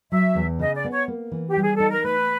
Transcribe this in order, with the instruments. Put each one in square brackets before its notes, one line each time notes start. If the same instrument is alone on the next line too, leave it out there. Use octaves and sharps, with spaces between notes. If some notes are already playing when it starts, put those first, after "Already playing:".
[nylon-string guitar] F#3 [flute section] E5
[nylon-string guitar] E2
[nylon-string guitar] C#3 [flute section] D#5
[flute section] D5
[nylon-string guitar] B3
[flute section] C#5
[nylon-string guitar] A#3
E3
[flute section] G4
[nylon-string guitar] G3
[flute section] G#4
[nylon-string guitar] D#4 [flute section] A4
[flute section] A#4
[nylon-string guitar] A3 [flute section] B4